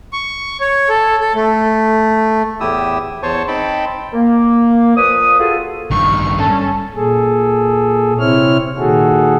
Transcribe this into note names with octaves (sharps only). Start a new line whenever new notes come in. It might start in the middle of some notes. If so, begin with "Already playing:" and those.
C#6
C#5
A4
A4
A3
E2 A2 E4 G4 D#6 E6
E2 C5 C#5 A5 C#6
C4 D#4 G5 A5 B5
A#3
A#2 F3 B4 D#6
F4 F#4 G#4 A4
A1 G2 D#3 C#6
C#4 A4
A#2 G#4 A4
C3 C4 E4 C#5 F6
A#2 D#3 F#4 G#4 A4